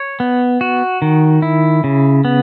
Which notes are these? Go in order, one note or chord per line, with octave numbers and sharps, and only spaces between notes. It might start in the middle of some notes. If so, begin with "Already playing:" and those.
Already playing: C#5
B3
F#4
D#3
E4
C#3
B3